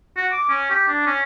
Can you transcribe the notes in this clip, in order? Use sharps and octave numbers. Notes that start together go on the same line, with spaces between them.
F#4
D6
C#4
G4
D4
C#4